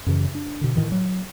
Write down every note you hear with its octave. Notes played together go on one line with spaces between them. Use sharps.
F#2 C#3 E3
D4
B2 D3
A2 D#3 E3
F#3